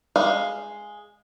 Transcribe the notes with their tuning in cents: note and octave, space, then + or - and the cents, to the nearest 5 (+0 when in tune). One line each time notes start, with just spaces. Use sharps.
G#3 +0 F5 +0